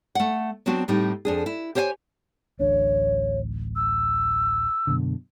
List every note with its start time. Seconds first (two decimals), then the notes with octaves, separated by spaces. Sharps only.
0.15 A3 F#5
0.66 F#3 B3 C4 D4 F#4
0.88 A2 G3 C4 D#4
1.25 F2 D4 G#4
1.46 E4
1.75 G4 C5 C#5 E5 G#5
2.59 D1 A1 D4 C#5
3.76 E6
4.87 F#2 B2 D3